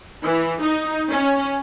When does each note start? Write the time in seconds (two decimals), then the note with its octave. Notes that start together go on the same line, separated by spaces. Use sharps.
0.24 E3
0.61 D#4
1.10 C#4